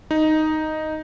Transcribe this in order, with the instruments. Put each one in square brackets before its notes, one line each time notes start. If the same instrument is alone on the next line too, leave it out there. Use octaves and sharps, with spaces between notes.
[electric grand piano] D#4